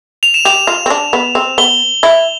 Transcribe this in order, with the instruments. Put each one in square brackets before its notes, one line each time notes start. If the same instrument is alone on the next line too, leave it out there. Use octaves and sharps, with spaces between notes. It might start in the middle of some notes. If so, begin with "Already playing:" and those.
[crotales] F7
E7
[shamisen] G4 [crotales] F7
[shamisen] F4
C4
D4
B3
C4
[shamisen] B3 [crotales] G7
[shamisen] E4